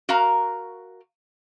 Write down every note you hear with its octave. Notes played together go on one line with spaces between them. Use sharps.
F#4 A#4 F5 A#5